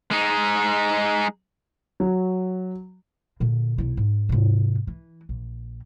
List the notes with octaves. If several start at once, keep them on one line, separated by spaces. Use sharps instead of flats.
G#3 D#4
F#3
A#2 D3
B1 E4
G#2
G#2 C3
E3
A#1